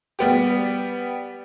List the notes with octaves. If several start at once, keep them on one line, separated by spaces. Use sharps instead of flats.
G3 B3 G4